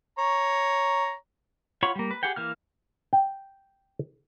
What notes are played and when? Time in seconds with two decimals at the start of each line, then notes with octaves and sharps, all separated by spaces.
0.18 C#5 A#5
1.83 F4 C#5 F#5 B5 C#6
1.96 G3 A#3
2.11 B4
2.23 G4 G#4 F#5 G5
2.36 E3 A#3 F6
3.13 G5